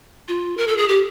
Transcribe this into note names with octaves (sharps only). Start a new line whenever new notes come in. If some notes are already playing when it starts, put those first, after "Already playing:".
F4
A#4
A4
G#4
G4